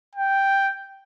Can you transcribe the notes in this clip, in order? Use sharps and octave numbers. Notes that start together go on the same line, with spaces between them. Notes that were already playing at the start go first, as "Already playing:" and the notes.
G5